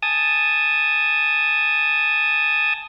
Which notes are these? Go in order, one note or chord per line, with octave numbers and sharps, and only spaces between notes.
G#5 A5 D#6